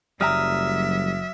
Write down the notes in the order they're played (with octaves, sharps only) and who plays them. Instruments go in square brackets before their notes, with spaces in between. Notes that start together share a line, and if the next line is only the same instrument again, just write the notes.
[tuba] F#1 [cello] F#3 E5 [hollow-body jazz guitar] G3 G5 A#5 [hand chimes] D#6 F6